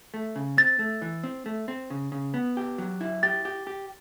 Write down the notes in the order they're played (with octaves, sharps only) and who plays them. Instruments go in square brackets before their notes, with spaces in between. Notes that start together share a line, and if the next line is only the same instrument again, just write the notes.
[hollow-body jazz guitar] A3
C#3
[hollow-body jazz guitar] C4 [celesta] A6
[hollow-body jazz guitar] A3
E3
C4
A3
C4
C#3
C#3
B3
G4
F#3
E4
[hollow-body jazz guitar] G4 [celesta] A6
[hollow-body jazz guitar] G4
G4